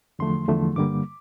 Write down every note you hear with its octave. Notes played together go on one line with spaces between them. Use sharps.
E2 D3 F3 A3 C6
E2 D3 F3 A3
G2 D3 G3 A#3 D6